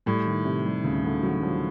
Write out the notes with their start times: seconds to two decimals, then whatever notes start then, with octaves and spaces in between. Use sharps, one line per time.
0.06 A2 G3
0.26 D#3
0.45 C3
0.66 G3
0.84 D2 C#3
1.04 D2 D3
1.23 D#3 F#3
1.42 F3 G3